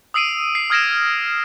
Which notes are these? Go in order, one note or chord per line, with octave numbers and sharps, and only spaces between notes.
D#6 E6 C7 D7 D#7
C7
D#6 F6 G#6 A#6 D7 E7